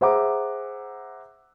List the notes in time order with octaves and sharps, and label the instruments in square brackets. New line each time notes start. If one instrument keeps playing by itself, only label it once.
[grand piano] G#4 C5 E5 F#5 A#5 D6